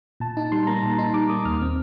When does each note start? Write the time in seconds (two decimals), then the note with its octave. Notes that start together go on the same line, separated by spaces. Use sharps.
0.20 A#2 A5
0.37 D#4 A5
0.52 G3 C6
0.67 A#3 A#5
0.83 A#2 A5
0.98 D#4 C6
1.14 G3 D6
1.29 A#3 D#6
1.45 D#2 F6
1.62 C4